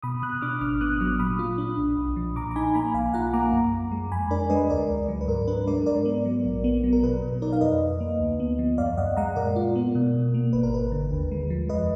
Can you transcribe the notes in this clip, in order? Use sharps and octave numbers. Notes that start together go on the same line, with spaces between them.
B2 B5 D#6
B2 D#6 F#6
D4 D6 F6
G#1 D6 F6
B3 D#6 F#6
F#3 D6 F6
A#2 B5 D#6
F4
D4
B1
B1
F3
A#2 A#5 D6
A#5
D#4 G#5 B5
A#3 G#5 B5
B1 F5 G#5
F4 F#5 A#5
A#3 A#5 D6
F#2
F#2
G#3
F2 G#5 B5
D4 A#4 D5
G#3 B4 D#5
D2 A#4 D5
D2
F#3
B4
G#2 A#4
D4 B4
G#3 A#4 D5
G#2 A#4 D5
B3
F#3
A#1
B3
F#3
A#4
B2 B4
B2
D#4 A#4 D5
F5
F2 B4 D#5
F2
A#3
D2
B3
F3
F#2 D5 F5
F#2 D#5 F#5
G#3 F#5 A#5
A#2 A#4 D5
F4
B3
B2
B2
A#3
G#1 B4
A#4
G#1 B4
D3
D#2
G#3
F3
F2 B4 D#5